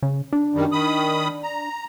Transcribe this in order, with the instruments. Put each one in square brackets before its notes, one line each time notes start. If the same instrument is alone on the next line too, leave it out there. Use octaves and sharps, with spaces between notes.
[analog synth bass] C#3
D4
[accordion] F#2 D#3 G3
D#3 B5 D#6
A#5